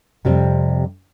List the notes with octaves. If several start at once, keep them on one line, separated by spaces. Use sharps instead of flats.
F2 C3 G3 C4